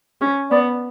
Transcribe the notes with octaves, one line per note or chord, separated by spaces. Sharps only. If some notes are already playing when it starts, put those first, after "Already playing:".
C#4
B3 D5